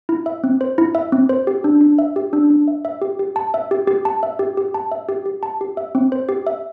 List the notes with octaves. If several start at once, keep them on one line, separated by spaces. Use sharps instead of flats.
E4
E5
C4
C5
E4
E5
C4
C5
G4
D4
D4
E5
G4
D4
D4
E5
E5
G4
G4
A5
E5
G4
G4
A5
E5
G4
G4
A5
E5
G4
G4
A5
G4
E5
C4
C5
G4
E5